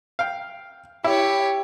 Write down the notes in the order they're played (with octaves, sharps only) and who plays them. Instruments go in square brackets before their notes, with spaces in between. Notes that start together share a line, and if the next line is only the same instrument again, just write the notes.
[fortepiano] F5 G5
[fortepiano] E4 [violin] G4 C#5